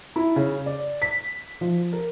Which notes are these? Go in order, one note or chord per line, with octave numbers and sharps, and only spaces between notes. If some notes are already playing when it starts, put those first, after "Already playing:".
E4
C#3
D5
B6
F3
A#4